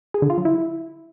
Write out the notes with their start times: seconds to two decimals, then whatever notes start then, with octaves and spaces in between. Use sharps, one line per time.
0.14 G#4
0.22 D3
0.30 F4
0.37 F#3
0.45 E4